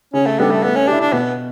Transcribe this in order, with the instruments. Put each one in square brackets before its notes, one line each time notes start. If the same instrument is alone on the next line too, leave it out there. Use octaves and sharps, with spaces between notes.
[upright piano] C#3 [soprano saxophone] C#4
[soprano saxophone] A3
[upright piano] G3 D4 A4 [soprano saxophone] B3
[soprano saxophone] A3
[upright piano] A3 [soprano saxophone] B3
[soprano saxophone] C#4
[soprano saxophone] D4 [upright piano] G4
[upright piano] E4
[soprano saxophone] D4
[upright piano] B2 [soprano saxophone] B3